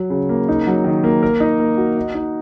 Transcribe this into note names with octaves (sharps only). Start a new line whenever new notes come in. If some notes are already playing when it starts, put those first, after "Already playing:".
Already playing: F#3 F#4
C#3
A#3
D#4
F#3
D#3
A#3
A#4
D#4
A#3
F#4
D#5
D#4